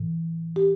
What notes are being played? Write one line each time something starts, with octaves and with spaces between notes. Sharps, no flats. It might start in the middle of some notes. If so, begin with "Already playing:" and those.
Already playing: A2 E3
G4